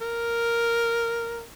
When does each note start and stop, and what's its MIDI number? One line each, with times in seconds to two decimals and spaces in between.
0.01 1.42 70